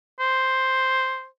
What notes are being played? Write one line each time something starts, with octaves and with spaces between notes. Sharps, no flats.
C5